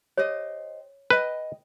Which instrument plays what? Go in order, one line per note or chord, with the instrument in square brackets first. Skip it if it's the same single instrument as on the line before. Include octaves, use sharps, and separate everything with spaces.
[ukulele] G4 C5 D#5 [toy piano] C#5
[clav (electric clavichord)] B4 [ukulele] D#5 G5